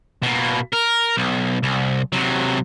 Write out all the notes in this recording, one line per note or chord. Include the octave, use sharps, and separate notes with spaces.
B2 A#3
A#4
B1
C2
C3 F#3